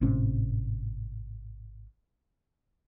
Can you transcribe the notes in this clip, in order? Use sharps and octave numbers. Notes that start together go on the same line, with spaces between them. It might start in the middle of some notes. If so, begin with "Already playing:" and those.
G#1 A2 C3 C#4